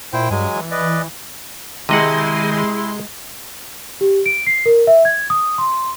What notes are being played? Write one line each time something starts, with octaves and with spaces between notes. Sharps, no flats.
A#2 E4 C5 G5
G2 F#3 G#3 G#5
E3
B4 D5 D#5
C3 D#3 G#3 E4 D#5 F#5 C6
G4
D7
C7
A#4
E5
G#6
D#6
C6